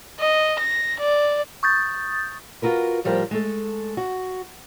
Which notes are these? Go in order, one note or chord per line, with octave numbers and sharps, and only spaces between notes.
D#5
A#6
D5
C#6 D#6 G6 A6
F4 F#4 A#4 B4
A2 F3 G3 G4 A#4 C5
G#3 A3 A4
F#4